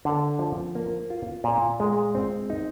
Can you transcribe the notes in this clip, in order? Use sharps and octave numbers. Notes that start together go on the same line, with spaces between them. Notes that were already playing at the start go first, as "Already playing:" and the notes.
D3
F3
A#3
F4
A#2
G#3
C4
D#4